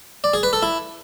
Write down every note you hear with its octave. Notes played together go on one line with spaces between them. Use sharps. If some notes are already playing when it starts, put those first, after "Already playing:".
D5
G#4
B4
A4
E4